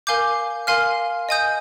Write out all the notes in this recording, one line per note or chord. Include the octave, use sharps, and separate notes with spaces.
A#4 F5 G#5 D6 G6
A#4 F5 G#5 C6 F6
D#5 G#5 D#6 G6